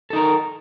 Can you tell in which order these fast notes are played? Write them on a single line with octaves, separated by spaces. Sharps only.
A4 D#4 A#4